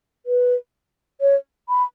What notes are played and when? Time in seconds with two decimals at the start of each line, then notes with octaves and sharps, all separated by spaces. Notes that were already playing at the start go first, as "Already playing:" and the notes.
0.26 B4
1.21 C#5
1.69 B5